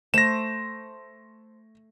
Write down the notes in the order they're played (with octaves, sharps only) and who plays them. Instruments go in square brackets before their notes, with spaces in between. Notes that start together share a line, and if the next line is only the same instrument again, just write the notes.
[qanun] A3 C5 [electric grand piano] A#6 E7